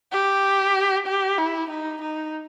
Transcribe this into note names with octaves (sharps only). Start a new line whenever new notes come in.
G4
G4
E4
D#4
D#4